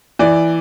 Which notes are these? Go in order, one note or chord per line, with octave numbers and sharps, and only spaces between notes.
E3 D5